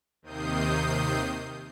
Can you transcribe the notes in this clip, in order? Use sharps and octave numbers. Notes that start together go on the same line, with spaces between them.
D#2 C3 D#3 D#6 G6 C7